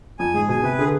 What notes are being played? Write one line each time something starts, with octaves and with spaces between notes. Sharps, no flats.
F2 G#5
G#2 G#4
B2 G#5
C3 B4
D3 G#4